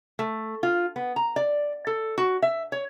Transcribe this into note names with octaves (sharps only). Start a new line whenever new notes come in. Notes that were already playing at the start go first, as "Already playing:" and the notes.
A3
F4
B3
A#5
D5
A4
F#4
E5
C#5